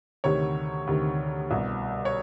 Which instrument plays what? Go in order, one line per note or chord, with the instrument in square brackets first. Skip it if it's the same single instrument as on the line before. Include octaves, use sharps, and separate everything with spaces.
[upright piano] D2 C3 D#3 C#5
D2 C3 D#3
C2 B2
C#5